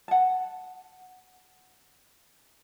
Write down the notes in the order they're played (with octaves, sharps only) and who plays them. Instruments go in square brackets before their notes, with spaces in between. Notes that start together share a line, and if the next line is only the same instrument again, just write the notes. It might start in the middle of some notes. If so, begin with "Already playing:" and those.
[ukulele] F#5 A5